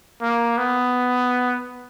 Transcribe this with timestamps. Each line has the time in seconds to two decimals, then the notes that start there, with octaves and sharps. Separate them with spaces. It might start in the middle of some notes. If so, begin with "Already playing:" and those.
0.21 A#3
0.58 B3